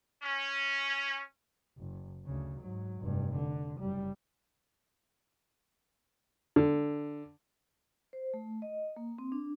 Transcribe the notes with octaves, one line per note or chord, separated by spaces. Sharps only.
C#4
F#1
D2 C#3
G#2 F#3
F1 G2
D3
F#1 G3
D3
C5
A3
D#5
A#3
C4
D4